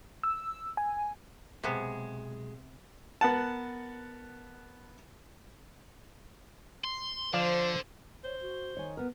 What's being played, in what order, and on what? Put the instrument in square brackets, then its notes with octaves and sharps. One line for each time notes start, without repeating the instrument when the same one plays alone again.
[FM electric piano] E6
G#5
[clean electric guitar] B1 G#3 G#4 [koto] C3 B3
[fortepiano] B3 A#4 F#5 A5
[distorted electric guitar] C6
[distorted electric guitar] D3 [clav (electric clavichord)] F3 D5 F5 [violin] C5
[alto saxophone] C5 [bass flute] C#5
[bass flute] F#4
[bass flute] D#3 [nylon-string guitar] C#5 G#5
[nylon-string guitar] B3 A#4